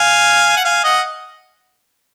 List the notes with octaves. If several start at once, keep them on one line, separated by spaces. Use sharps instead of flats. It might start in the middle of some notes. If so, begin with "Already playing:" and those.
Already playing: F5 G#5
F#5
F5 G#5
D#5 F#5